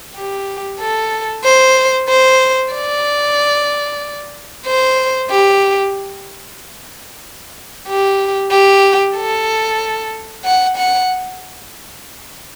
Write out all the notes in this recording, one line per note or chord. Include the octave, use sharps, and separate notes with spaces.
G4
A4
C5
C5
D5
C5
G4
G4
G4
A4
F#5
F#5